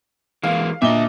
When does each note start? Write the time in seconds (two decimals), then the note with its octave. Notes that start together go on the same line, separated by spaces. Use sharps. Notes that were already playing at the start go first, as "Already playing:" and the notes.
0.43 E3 G#3 A#3 F5
0.82 A#2 D4 D#5 E5 G7